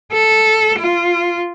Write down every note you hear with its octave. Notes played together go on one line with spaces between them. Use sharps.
A4
F4